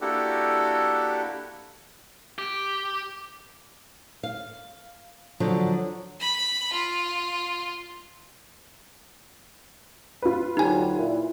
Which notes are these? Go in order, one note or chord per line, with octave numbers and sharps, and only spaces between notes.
A#3 D4 E4 F#4 G4 A4
G4
F5
D3 F3 F#3
B5
F4
F4 B4
D2 F#3 D#4 G4 G#5
A#2 E4